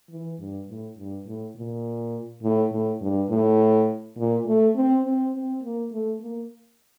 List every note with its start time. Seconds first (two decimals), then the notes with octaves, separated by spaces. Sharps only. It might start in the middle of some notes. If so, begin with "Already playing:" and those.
0.10 E3
0.39 G2
0.68 A2
0.97 G2
1.26 A2
1.56 A#2
2.43 A2
2.72 A2
3.01 G2
3.30 A2
4.17 A#2
4.47 A3
4.76 C4
5.05 C4
5.34 C4
5.63 A#3
5.92 A3
6.21 A#3